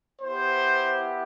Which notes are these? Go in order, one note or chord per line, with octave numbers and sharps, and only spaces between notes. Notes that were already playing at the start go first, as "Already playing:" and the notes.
B3 E4 G4 C5